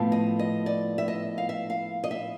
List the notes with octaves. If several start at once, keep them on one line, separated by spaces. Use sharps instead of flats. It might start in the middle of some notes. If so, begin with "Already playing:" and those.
Already playing: A2 F3 B3
D#5
D#5
D5
E5
D#5
F5
E5
F5
D#5
E5